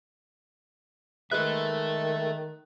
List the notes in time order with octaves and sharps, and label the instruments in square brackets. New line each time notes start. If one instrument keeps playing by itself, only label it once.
[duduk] D#3 [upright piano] G#3 B4 F#6 [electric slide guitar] A4 E5